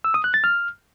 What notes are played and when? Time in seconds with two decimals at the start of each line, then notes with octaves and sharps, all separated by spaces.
0.04 E6
0.14 D#6
0.24 F#6
0.34 A6
0.44 F6